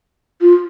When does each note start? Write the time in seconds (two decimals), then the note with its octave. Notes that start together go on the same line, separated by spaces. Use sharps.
0.41 F4